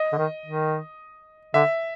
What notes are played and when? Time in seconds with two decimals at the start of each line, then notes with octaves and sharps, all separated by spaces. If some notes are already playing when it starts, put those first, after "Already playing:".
Already playing: D#5
0.12 D3
0.18 D#3
0.46 D#3
1.54 D3 E5